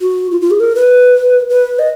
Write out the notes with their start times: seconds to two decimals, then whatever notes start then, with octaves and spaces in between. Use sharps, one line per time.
0.01 F#4
0.31 F4
0.41 F4
0.51 G#4
0.60 A#4
0.75 B4
1.50 B4
1.79 D#5